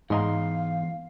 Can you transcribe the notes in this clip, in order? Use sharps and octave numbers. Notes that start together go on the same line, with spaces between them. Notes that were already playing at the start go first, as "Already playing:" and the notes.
E2 G#2 D#5 F5 A#5 C6